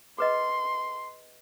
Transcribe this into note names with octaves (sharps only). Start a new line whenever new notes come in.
G#4 B4 D#5 C6